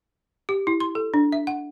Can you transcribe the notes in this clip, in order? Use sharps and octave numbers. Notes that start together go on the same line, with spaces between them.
G4
E4
C6
A4
D4
E5
F#5